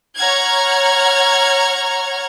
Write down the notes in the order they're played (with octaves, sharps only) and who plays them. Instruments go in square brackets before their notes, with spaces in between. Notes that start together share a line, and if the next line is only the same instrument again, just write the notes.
[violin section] C#5 F#5 A#5 F6 G#6